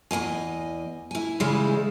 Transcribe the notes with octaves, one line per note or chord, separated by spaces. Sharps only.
E2 E3 D#5 G#5
E4 G#5
C#3 E3 G3 G#3 E4